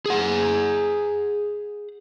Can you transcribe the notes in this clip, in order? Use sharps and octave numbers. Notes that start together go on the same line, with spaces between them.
G#4 F#5